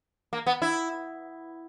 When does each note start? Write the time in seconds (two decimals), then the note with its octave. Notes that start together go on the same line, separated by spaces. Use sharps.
0.33 A#3
0.46 B3
0.62 E4